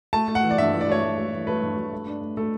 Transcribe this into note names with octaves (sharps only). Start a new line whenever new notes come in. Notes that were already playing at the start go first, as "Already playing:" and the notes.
A3 A5
A3
F#5
E3
D5
G2 E5
E3
D5
A3 C#5
A3
A3
E3
A3 B4
G2
G2
A3
D4
A3
A3 A4